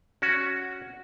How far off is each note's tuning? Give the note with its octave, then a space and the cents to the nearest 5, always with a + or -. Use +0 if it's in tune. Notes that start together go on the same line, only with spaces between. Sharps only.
C#4 +0 F#4 +0